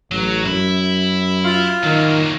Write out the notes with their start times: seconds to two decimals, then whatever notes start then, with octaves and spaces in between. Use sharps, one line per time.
0.12 A1 F#3
0.46 F#2 E4
1.44 F4
1.84 D#3 F#3 A#3